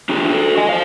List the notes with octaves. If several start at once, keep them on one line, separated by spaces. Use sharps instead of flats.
D4 F4 G4 G#4
F#4 A4
D#5 G#5
C5 F5